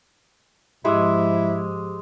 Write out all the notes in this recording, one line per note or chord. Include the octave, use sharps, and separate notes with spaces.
G#2 F3 G#3 E4 G4 D6 E6